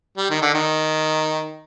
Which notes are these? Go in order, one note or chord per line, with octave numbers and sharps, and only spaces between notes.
G3
D#3
D3
D#3